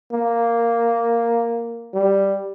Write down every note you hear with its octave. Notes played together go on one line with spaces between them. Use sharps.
A#3
G3